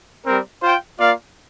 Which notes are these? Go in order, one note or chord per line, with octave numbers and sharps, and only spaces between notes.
G3 C4 A#4
F4 C5 G5
A#3 F4 D5 F5